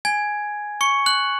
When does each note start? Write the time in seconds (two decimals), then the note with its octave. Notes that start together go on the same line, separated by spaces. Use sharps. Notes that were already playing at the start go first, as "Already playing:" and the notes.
0.05 G#5 G#6
0.81 C#6 C#7
1.06 F#6 F#7